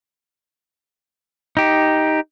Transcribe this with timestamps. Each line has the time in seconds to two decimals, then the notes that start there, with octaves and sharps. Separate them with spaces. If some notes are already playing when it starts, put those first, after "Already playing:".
1.57 D#4 G4